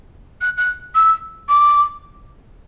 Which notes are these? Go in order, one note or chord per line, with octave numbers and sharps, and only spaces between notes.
F#6
F#6
E6
D6